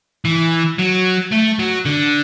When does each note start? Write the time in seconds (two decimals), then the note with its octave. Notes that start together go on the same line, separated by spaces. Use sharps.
0.25 E3
0.79 F#3
1.32 A3
1.59 F#3
1.85 D3